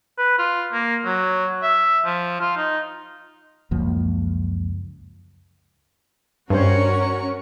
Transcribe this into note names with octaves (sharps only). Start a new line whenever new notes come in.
B4
F4
A#3
F#3
E5
F3
F4
D#4
C#2 F#2 F3 A#3
G2 G3 C#4 F#4 A#4 C5 C#5 C#6